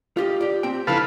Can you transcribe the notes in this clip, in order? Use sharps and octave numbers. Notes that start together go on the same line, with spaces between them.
F4 G4 D#5
G4 D5
C4 G5
C#3 F3 E4 A4 B4 F5